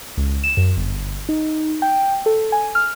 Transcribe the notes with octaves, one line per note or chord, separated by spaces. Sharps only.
C#2
E7
F#2
G1
D#4
G5
A4
G#5
F6